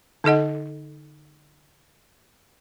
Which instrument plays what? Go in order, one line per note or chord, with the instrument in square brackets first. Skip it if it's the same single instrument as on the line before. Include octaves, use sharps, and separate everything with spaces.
[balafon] D3 D#4 A4 D#5 F#5